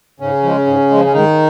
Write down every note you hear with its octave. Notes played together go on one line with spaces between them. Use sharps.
G#2 C#3 C#4
F3 G#3
G#2
F3 G#3
C#4
G#2 D#3 D#4